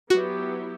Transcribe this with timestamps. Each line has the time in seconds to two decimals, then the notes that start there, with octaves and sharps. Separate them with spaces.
0.10 F#3 B3 E4 F#4 G4